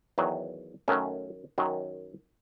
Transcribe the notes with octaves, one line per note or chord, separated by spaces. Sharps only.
E2 D#3 F#3
F#2 D#3 F#3 A3 C#4
F#2 D#3 F#3